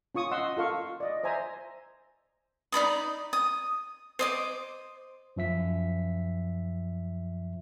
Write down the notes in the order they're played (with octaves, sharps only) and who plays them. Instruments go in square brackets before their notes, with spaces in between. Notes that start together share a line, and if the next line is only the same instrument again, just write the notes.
[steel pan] C#4 F4 C#6 D#6
D#5 F#5 C6 E6
F4 A4 F5 C#6
D5 D#5
C5 E5 G#5 A#5
[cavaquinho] D#4 D5 B5 D#6
D#6
C5 D#5 D6
[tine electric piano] F#2 F3 E5 B6